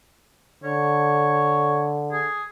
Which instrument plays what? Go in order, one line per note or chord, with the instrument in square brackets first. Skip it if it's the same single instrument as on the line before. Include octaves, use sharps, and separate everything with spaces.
[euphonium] D3 [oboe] C#5
[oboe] G#4